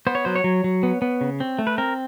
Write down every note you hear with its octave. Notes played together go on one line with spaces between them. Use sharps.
B3 C5
C#5
F#3 C5
C#5
F#3
F#3
B3
B3
C#3
C4
A3
B4
C4 A#4